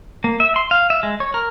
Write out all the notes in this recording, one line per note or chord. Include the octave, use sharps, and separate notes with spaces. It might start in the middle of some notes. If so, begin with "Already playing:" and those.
A#3
E5
C6
F5
E5
G#3
C#5
A#4